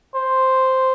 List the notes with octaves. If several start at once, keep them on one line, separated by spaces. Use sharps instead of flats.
C5